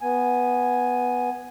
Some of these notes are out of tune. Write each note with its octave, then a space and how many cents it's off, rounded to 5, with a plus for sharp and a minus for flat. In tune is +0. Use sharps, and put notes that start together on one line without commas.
B3 +0 G#5 +0